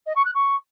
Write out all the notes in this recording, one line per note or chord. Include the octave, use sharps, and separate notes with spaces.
D#5
C#6
F#6
C#6